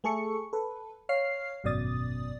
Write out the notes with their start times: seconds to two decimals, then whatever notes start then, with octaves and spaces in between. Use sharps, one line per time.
0.04 A3 G#4 A4 C#6 C#7
0.53 A4 B4
1.09 C#5 F5 F6 C7
1.64 G#1 F#2 B2 D5 D#6 A6